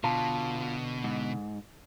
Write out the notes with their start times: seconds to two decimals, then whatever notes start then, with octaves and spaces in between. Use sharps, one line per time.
0.04 B2 D3 F4 A5
1.04 G#2